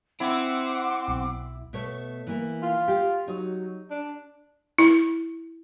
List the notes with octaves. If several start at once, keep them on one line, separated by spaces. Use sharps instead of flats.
C4 E4 F#5 C6 D6
B1
B2 A3 C#5
E3 A#3 E4
F4
G4
F#3 D#4
D4
E4